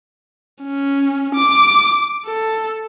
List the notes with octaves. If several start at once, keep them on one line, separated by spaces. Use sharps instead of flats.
C#4
D6
A4